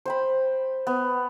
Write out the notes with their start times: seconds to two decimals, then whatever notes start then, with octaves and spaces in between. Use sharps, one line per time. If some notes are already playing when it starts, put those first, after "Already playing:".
0.05 C5 G5 B5
0.87 B3